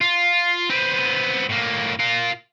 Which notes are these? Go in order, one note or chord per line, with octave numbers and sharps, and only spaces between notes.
F4
B3 C4
A2 A#3
F4 A#4